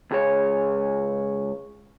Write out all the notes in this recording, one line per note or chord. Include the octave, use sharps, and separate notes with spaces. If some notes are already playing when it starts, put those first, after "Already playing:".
C#2 G#4 C#5